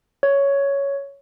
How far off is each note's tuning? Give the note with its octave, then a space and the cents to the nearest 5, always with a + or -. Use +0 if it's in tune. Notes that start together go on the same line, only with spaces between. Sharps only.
C#5 +5